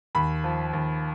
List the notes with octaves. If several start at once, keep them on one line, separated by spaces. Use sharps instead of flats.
D#2 B5
F3
D#2